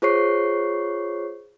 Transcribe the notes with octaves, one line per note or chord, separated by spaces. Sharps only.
F4 G#4 C5 C#5 C#6 C7